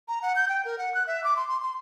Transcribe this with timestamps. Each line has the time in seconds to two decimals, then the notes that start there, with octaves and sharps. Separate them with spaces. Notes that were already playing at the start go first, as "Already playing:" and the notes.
0.08 A#5
0.22 F#5
0.36 G6
0.49 G5
0.65 A#4
0.78 F#5
0.95 F#6
1.07 E5
1.24 D6
1.36 C6
1.49 C6
1.63 C6